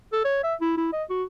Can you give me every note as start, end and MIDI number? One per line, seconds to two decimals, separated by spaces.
0.13 0.21 69
0.25 0.39 73
0.44 0.54 76
0.61 0.72 64
0.77 0.88 64
0.93 1.04 75
1.10 1.24 66